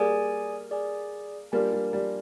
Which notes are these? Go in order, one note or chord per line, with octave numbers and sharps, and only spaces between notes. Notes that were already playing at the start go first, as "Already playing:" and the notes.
Already playing: G3 A#3 G#4 D5 G#5
G#4 D5 G#5
G3 A#3 D4 F4 A#4 F5 G#5
G3
G3